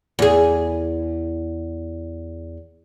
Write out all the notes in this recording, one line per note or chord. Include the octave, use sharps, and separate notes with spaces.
E2 G#4